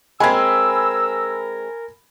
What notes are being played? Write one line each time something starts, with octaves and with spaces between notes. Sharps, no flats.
G#3 C4 A#4 G#5 B5 E6 G#6